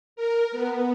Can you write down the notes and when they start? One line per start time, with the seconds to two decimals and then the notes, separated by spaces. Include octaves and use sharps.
0.16 A#4
0.51 B3